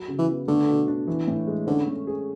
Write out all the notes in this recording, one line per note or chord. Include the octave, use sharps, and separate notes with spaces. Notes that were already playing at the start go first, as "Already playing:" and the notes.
Already playing: F#3
C#3
E3
B3
D3 A3
B2
D4
E3
A2
G#3
D3 C#4
A3
G#4